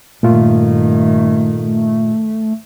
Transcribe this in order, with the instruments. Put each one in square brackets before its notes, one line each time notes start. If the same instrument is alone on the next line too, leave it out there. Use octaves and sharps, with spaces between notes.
[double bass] G2 D#3 [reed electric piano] A#2 F4 [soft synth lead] A3